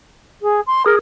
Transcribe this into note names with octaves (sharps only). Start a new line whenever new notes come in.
G#4
C6
G#4 A#4